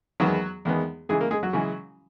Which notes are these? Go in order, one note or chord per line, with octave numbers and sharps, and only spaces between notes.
E2 D#3 F#3 G#3 B3 F#4
E2 D#3 G#3 B3
C#3 E3 G#3 G#4
A#3 A#4
G#3 G#4
F#3 F#4
C#3 E3 G#3